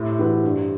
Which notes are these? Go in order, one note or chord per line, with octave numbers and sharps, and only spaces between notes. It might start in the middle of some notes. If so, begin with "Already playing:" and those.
Already playing: A2 C3
E3 B3 F#4 B4
G2